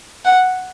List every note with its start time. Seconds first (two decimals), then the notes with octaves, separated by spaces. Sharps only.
0.25 F#5